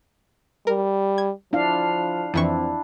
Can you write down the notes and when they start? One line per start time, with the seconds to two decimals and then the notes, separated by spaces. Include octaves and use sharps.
0.67 G3 A#4
1.18 G#6
1.53 F3 D4 E4 F5
2.34 F2 E3 C4 D4 E4 C#6